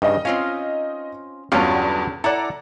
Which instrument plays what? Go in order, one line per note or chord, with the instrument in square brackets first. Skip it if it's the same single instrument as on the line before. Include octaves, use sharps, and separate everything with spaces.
[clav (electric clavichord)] G2 C#3 [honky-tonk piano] D#4 D#5
[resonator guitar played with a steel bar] C4 F4 F5 [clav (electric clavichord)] C#4
[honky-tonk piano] E2 G2 [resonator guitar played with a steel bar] D3 C#4 G4 [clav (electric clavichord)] F#3 F4 F5
[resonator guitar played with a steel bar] E4 [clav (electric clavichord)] A4 F#5 [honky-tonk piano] D5 A#5